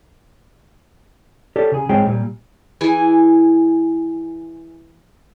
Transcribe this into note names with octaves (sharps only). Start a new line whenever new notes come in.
G4 A4 C#5 D5
C#3 G#4
G#2 G#3 C4 G#4 C#5 G5
A#2 G3
E3 E4 G#4 G#5